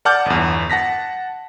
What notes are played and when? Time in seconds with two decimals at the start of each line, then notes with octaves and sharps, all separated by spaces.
0.05 D5 F#5 A5 D6 F6 G6
0.26 G1 E2
0.70 F#5 A5 A#6 B6